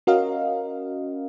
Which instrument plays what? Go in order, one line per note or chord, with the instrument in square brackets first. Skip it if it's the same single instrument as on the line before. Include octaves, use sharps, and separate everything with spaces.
[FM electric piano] C#4 F#4 A#4 D#5 F5